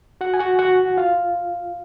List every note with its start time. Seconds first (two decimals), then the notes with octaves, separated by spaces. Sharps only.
0.21 F#4 F#5
0.34 G#5
0.39 F#4 F#5
0.59 F#4 F#5
0.97 F4 F5